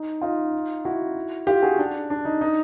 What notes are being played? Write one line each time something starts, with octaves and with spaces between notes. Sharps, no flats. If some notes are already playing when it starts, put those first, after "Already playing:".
Already playing: D#4
D#4 F4
E4 F#4
F4 G4
F#4 G#4
D4
D4
D#4
D#4